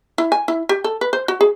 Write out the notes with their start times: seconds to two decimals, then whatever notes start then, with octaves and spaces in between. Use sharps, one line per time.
0.18 E4
0.32 G#5
0.48 E4
0.69 G4
0.84 A4
1.01 B4
1.13 C5
1.28 F#4
1.41 G#4